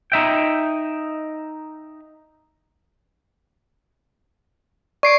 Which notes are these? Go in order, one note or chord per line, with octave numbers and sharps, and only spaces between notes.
D#4 E5 G5
D5 C#6 C7 D7